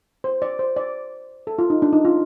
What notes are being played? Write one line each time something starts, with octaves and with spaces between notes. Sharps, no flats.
C5
D5
C5
D5
A4
F4
D#4
D4
D#4
F4